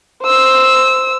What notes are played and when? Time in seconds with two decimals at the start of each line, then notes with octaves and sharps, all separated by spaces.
0.23 C5 E6